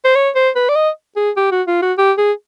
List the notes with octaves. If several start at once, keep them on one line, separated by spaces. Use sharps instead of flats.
C5
C#5
C5
B4
D5
D#5
G#4
G4
F#4
F4
F#4
G4
G#4